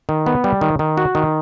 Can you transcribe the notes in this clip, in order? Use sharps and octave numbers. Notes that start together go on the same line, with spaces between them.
D#3
B3
G3
D#3
D#3
F#4
D#3